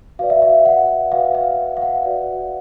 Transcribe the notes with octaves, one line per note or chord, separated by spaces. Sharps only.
F#4 B4 D5 F5
E5
F5
F#5
F#4 B4 D5 F5
F5
F5
F#5
F#4 B4 D5